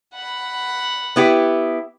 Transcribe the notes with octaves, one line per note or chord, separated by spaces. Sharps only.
F#5 B5
B3 E4 G4